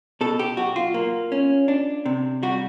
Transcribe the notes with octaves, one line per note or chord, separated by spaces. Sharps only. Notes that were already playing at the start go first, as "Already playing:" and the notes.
B2 A4
G4
B1 F#4
F4
A#3
C#4
D4
C3
G3 F#4